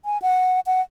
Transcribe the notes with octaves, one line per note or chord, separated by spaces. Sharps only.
G#5
F#5
F#5